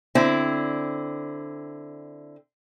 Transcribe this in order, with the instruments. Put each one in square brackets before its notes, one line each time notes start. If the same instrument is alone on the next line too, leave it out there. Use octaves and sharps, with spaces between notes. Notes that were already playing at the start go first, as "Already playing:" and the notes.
[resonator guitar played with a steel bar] D3 C4 E4